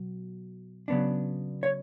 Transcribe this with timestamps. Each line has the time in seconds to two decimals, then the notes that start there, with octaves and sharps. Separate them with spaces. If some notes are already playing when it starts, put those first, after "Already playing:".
Already playing: B2 F#3
0.88 C#3 F#3 B3 D4
1.63 C#5